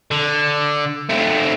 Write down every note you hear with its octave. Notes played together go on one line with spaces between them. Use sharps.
D3
A3 C4